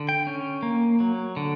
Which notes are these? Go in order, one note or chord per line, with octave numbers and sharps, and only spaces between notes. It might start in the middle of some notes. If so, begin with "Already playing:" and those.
Already playing: D3
G5
C#4
A#3
F#3
D3